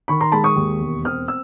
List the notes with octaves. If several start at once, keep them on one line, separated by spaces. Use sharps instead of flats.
D#3 B5 C#6
A#5 C6
G#3 A5 B5
C#6 D#6
D#2
E1
C4 D#6 F6
E6